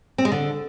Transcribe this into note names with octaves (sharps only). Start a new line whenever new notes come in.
C4
G#3
D3